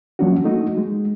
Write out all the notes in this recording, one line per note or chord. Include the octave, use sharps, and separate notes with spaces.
F3 F#3 A#3 C#4 D4 F#4
A3 A#3 D#4 F#4
G#3